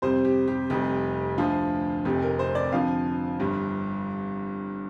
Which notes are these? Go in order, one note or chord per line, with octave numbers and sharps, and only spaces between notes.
F2 C3 G3 C5
G4
G4
F1 F2 C3 G3 G4
D2 D3 F3 F4
F1 F2 C3 G4
A#4
C5
D5
F2 D3 F3 F5
G1 G2 G3